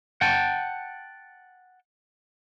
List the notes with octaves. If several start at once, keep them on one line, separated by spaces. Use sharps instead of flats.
F#5 G5 A5